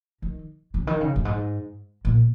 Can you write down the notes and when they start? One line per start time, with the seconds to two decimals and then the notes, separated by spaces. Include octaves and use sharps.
0.22 D#3
0.74 C#3
0.87 D#3
1.01 C#3
1.16 G2
1.25 G#2
2.05 A#2